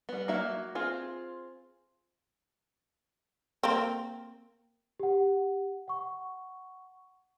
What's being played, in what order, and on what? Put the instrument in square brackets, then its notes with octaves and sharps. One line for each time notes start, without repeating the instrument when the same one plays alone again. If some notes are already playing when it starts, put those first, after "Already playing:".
[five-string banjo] G3 B3
F#3 A#3 F#4 E5 A#5
C4 F4 G#4
[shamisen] A#3 C4
[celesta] G4 F#5
F#5 C#6